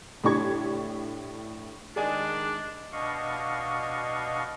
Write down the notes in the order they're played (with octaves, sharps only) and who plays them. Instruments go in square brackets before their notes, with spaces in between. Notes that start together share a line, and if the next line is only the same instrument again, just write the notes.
[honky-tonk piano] A2 D4 G4 C#6 G#6
[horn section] D#3 G#3 [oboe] D4 [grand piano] G#4 D5 G#5
[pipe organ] B2 D4 D#5 F5 C#6